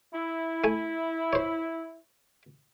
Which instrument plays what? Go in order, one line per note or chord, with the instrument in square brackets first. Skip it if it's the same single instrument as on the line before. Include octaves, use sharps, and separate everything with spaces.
[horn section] E4
[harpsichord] A3 G#5
C5 C#5